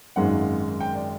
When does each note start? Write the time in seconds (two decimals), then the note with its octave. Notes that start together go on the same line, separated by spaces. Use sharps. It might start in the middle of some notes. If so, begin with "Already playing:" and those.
0.16 G#1 F#2 D#3 G#3 F#5
0.80 G5
0.95 D5